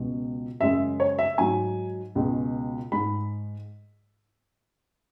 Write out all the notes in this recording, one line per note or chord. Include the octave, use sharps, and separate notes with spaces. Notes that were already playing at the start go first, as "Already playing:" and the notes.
Already playing: C#2 B2 G#3
F#2 C#3 G#3 E5
C#5
E5
G#2 F#3 G#5
C#2 B2 G#3
G#2 G#3 B5